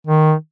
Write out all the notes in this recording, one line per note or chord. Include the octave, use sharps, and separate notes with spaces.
D#3